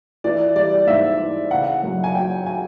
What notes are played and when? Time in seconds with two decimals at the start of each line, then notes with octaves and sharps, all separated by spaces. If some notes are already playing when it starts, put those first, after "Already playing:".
0.24 E3 D5
0.55 G3 D5
0.87 G#2 E5
1.19 E3
1.51 C#3 F#5
1.83 F#2
2.04 G#5
2.15 F#3 G5
2.46 G#5